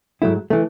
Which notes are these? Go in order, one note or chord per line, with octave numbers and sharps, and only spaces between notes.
G#2 F#3 A3 E4
E3 A3